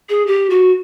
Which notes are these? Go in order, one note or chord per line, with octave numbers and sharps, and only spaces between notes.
G#4
G4
F#4